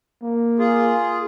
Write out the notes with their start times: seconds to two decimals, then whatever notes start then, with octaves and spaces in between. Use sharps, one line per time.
0.22 A#3
0.59 F4 G#4